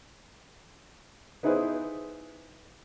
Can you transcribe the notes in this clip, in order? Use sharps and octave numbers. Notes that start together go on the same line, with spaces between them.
B3 D#4 E4 G#4 B4 C5